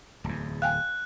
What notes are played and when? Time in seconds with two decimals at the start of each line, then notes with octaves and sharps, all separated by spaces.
0.24 D1 E2
0.62 F5 G5 G#5 F#6